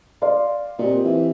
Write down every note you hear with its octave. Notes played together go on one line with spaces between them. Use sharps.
D5 F5 C6
A#2 C4 G4 D#5
E3